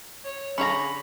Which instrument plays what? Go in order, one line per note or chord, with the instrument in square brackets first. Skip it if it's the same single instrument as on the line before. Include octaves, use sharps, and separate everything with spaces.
[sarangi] C#5
[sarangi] D3 [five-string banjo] C#4 G#4 A#5 [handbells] B5 [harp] C#6 A#6